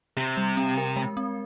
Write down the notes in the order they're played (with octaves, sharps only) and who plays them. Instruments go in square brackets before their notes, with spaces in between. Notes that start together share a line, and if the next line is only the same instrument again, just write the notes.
[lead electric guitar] C3 [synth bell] G4
[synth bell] G3
C4
A#4
G#3
C4